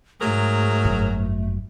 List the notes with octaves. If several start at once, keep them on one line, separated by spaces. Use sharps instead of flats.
G#2 F#3 A3 G#4 A#4
G1 F#2